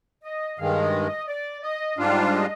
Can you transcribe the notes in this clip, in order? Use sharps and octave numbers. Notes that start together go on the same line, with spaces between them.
D#5
G2 D#3 G#3 F5
D#5
D#5
D5
D#5
G#2 G3 D4 F4 F5
D#5